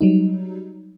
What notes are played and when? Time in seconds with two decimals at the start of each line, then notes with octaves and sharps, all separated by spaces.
0.01 F#3 G3 D#4